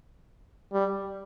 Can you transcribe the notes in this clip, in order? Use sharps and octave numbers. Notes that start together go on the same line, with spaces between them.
G3